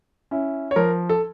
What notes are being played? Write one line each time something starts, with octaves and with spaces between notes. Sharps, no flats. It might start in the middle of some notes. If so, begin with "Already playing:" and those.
C#4 E4
C#5
F3 A#4
A4